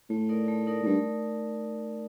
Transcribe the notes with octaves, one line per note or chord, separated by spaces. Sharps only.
A2 A3
D#4 A#4 D5
A3
D#4 A#4 D5
A2
G2 A3